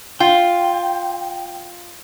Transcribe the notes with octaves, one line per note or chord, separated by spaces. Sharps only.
F4 G5